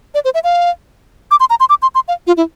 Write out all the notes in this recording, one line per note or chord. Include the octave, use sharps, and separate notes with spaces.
D5
C5
E5
F5
D6
C6
A#5
C6
D6
C6
C6
F5
F4
E4